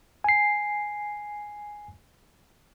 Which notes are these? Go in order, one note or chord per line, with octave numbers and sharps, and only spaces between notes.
G#5 C7